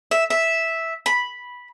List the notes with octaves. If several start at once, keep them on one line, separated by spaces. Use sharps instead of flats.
E5
E5
B5